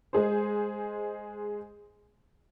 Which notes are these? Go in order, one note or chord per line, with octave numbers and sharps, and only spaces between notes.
G#3 G#4 C5